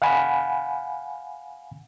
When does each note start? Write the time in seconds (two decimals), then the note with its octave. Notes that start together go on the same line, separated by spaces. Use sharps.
0.02 F5 F#5 G#5 B5